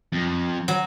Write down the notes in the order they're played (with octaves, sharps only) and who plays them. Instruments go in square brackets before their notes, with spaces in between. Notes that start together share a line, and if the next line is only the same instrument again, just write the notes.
[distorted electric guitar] F2
[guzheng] F#3